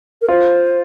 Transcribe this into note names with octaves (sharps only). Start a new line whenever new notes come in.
A#4
F4 C5